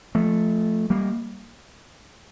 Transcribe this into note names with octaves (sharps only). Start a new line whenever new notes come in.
F3 A3
G3 A#3